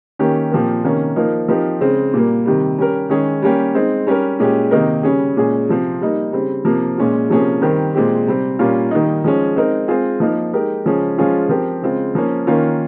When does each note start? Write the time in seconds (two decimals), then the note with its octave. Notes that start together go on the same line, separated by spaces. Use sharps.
0.19 D#3 A#3 C#4 G4
0.51 A#2 F3 C4 G4 A#4
0.83 C3 D#3 A#3 C#4
1.16 F3 A#3 D#4 A#4
1.48 F3 C4 D#4 G4 A#4
1.81 C#3 G#3 C4
2.14 A#2 G3 A#3
2.46 C3 D#3 G3
2.78 G3 C#4 G4 A#4
3.10 D#3 G#3 C#4 G#4
3.42 G3 A#3 C#4 G4
3.74 G#3 C4 D#4
4.07 G3 C#4 G4 A#4
4.40 A#2 G#3 C#4 G4
4.71 C3 D#3 A#3 D#4 A#4
5.03 C#3 G3 C#4 G#4
5.37 A#2 G#3 C#4 G#4
5.69 C3 F3 C4
6.01 G3 A#3 D#4
6.33 C#3 G3 C4
6.65 C3 F3 A#3
6.98 A#2 G#3 C#4 F4
7.29 C3 F3 A#3 C#4 G#4
7.62 D#3 G3 C4 G4 A#4
7.95 A#2 G#3 C4 G4
8.27 C3 G3 C4
8.59 A#2 G3 A#3 C#4 F4
8.91 D#3 G3 A#3 D#4
9.24 F3 G#3 C#4
9.55 G#3 C4 D#4 A#4
9.88 G#3 C4 F4 G#4
10.20 F3 A#3 D#4 A#4
10.53 G#3 D#4 G4 A#4
10.85 C#3 F3 G#3 C#4 G#4
11.18 F3 G#3 C#4 F4 G#4
11.49 F3 C4 G4 A#4
11.82 C#3 G#3 C4 F4
12.15 F3 A#3 C#4
12.47 D#3 A#3 C#4 F4